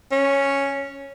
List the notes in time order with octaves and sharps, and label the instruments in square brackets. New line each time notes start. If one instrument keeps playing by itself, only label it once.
[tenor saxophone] C#4